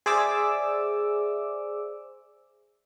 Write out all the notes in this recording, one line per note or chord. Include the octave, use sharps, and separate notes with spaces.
G#4 C5 D5 E5 D6 E6